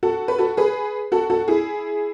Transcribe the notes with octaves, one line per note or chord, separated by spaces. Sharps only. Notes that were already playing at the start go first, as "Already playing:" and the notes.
F#4 A4
B4
F#4 A4
G#4 B4
F#4 A4
F#4 A4
E4 G#4